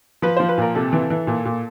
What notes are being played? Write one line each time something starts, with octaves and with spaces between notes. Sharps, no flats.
F3 B4
F3 C5
B4
A#2 A#4
C3 A4
E3
E3
A#2
A#2